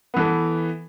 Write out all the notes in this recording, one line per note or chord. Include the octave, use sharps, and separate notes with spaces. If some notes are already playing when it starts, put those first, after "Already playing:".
E3 B3 A4